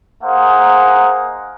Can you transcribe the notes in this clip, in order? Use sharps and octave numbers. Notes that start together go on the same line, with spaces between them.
A#3 D#4 G#4 C5 F#5 D#6